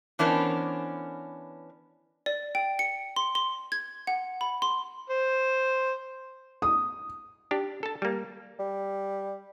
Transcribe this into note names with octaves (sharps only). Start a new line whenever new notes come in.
E3 B3 C#4 D4 A#4 C5
D5
G5
C#7
C6
C6
G#6
F#5
B5
C6
C5
D#6
D4 G4
A4 A5
G3 A#3
G3